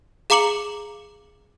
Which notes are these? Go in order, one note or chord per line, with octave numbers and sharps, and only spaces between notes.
G#4 F5 A#5 D6 C#7 F#7